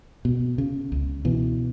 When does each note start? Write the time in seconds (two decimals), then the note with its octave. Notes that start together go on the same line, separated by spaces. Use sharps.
0.25 B2
0.58 C#3
0.92 C#2
1.25 B2 E3